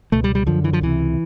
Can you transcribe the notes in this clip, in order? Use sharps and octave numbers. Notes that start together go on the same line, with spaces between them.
C#2 B2 A3
G3
G3
F#2 D3 F3
E3
F3
C#2 C3 E3